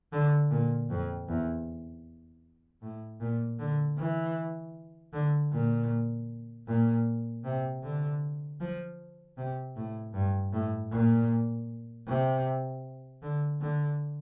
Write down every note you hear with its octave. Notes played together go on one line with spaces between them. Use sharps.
D3
A#2
F2
E2
A2
A#2
D3
E3
D3
A#2
A#2
C3
D3
F3
C3
A2
G2
A2
A#2
C3
D3
D3